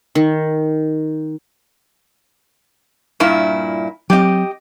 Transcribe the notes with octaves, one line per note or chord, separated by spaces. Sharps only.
D#3
G2 A#2 E4
F#3 C4 G4 D#5